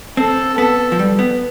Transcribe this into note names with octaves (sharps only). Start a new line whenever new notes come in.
C4 A4
B3 A4
F3
G3
B3